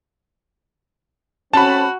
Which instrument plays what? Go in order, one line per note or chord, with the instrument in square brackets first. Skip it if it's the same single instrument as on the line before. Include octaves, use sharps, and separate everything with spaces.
[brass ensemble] A3 C4 C#4 [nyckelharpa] F#4 [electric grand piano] A5 B5